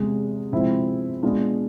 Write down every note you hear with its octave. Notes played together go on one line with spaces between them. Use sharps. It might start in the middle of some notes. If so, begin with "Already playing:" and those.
Already playing: E2 C3 G#3
C3 F3 G#3 C4 E4
B2 G#3 B3 D4 F4